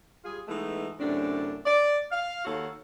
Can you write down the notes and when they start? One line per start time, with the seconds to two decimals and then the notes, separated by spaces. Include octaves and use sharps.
0.25 G3 F4 G#4
0.48 E3 G#3 A3 B3 D#4
1.00 F#2 A2 C3 D4
1.66 D5
2.11 F5
2.45 D#2 F#4 A4 C#5 F5